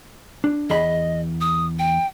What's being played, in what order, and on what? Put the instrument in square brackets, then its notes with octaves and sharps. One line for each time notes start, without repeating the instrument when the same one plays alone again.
[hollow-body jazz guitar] D4
[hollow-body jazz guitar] E2 G#4 B5 [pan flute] D#5
[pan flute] D#6
G5